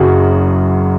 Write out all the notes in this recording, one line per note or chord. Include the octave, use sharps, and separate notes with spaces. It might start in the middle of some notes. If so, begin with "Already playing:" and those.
Already playing: F#1 F#2 F#4 G#4